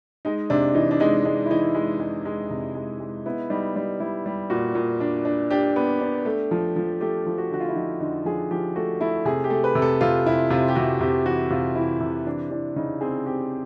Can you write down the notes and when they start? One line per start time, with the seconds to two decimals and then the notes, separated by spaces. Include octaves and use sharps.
0.25 G#3 D#4
0.50 C3 D4
0.75 E3 D#4
0.91 D4
1.00 G#3 D#4
1.25 G#3 D4
1.46 E4
1.50 E3 D#4
1.75 G#3
2.00 G#3
2.25 G#3
2.50 C3
2.75 G#3
3.00 G#3
3.26 B3 E4
3.50 G3 D#4
3.76 G3 D#4
4.00 G3 E4
4.26 G3
4.50 A#2 F#4
4.75 A#2
5.00 D4
5.25 D4
5.51 D4 G4
5.76 B3
6.01 D4
6.25 A3
6.51 F3
6.76 F3
7.01 A3 G4
7.26 F3
7.38 F#4
7.50 D3 F#4
7.60 F4
7.69 E4
7.76 F3 D#4
8.01 D3 D#4
8.25 F3 G#4
8.51 F3 G4
8.76 A3 F#4
9.01 A3 E4
9.25 C3 G#4
9.44 G4
9.50 A3
9.64 B4
9.75 C3
9.82 A4
10.01 C3 F4
10.26 C3 E4
10.50 C3 F4
10.68 G4
10.75 C3 F#4
11.01 C3 G4
11.26 E3 F#4
11.50 C3 F4
11.75 E3 E4
12.00 C3
12.26 E3 D4
12.50 E3 D4
12.76 C#3 D#4
13.01 C4 G#4
13.26 C4 G4